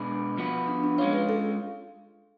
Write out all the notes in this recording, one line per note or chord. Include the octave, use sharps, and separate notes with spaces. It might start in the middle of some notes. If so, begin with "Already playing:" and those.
Already playing: B2 G#3 D4 G#4 B4
F3 B3 F#4 B4
D4
D4
G#3 C#4 F4 C#5
B4
A4